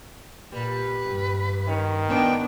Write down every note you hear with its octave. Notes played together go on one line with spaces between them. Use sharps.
A#2 G3 B4
G2
D#3 C#4
G#2 B3 D4 G5